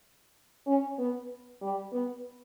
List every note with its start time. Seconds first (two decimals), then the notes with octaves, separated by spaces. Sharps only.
0.66 C#4
0.98 B3
1.61 G3
1.92 B3